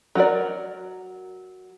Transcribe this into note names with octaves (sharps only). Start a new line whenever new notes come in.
F#3 F#4 A#4 D5